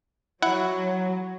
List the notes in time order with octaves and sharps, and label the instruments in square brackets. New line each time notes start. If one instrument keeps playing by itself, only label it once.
[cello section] F#3 [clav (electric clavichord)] E4 F#5